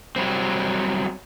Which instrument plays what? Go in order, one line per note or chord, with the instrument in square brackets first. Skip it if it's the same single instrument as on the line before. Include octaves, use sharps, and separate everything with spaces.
[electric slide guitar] F#3 G3 C4